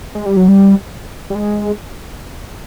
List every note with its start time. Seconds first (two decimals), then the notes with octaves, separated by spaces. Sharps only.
0.15 G#3
0.26 G3
0.37 F#3
0.48 G3
1.30 G3
1.35 G#3